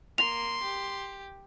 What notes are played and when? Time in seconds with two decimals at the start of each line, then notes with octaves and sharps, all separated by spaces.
0.18 A#3 C6 F7
0.63 G4